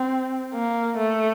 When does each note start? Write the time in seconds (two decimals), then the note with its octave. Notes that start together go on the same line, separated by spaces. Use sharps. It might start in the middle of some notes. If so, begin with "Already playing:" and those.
Already playing: C4
0.54 A#3
0.98 A3